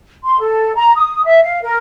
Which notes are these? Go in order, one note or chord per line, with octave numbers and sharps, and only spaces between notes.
C6
A4
A#5
D#6
E5
F5
A#4